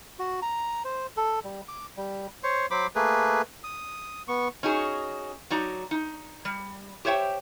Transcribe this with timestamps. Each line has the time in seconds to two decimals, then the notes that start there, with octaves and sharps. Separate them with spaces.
0.19 F#4
0.42 A#5
0.85 C5
1.17 A4
1.44 G3
1.68 D6
1.97 G3
2.43 C5 C#5
2.71 F#3 C5 B5 D6
2.95 A3 A#3 G#4 B4
3.64 D#6
4.28 B3 C#6
4.63 C#4 D#4 F#4 G#4
5.50 F#3 D#4 D5 A#5
5.91 D#4
6.45 G3
7.05 G4 C5 C#5 E5 G5